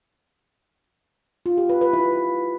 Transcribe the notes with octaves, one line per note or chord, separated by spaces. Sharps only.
F4
G4
B4
B4
E4